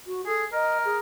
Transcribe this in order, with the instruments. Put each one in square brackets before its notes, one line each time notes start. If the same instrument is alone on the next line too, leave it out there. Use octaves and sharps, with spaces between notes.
[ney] F#4
[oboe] G#4 [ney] A4
[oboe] A#4 [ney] D#5
[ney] G#4